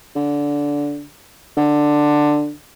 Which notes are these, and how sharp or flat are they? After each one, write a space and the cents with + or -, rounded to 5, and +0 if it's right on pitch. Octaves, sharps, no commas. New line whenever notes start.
D3 -15
D3 +10